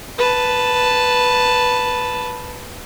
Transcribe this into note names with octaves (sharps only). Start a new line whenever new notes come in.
B4 A5